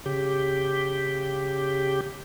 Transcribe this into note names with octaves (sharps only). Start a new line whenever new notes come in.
C#3 G4